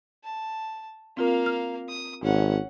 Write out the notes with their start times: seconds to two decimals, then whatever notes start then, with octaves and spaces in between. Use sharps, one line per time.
0.24 A5
1.17 A#3 C4 F4 A#4 F5
1.46 F6
1.89 D#6
2.22 G#1 C#4 F#5